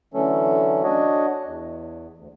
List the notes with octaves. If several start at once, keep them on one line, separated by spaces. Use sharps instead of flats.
D3 E3 F#3 A3 C#4 A4
D4 F#4 C#5 D#5
E2
D2